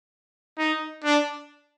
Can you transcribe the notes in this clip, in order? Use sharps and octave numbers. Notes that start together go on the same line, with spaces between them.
D#4
D4